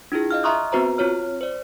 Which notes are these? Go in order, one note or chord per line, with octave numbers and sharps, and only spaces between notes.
D4 E4 F4 G#4
D#5 F5 F6
E5 A#5 C6 C#6 D#6 F#6
B3 C4 F#4 B4 C5 A#5
C4 F4 C#5 F6
C5 D5